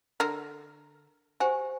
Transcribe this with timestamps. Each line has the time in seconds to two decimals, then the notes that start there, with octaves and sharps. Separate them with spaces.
0.20 D3 A#4
1.40 F#4 G4 C5 G#5